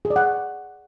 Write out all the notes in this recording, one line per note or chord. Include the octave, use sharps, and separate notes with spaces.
G#4
D5
F#5